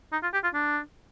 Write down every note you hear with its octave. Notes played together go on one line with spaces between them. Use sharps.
D#4
F4
G4
F4
D4